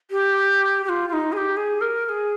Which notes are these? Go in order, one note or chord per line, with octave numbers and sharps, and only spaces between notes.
G4
G4
F4
F4
D#4
G#4
G4
G#4
A#4
A#4
G#4